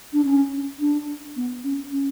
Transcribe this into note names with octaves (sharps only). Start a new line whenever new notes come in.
D4
C#4
D4
B3
C#4
C#4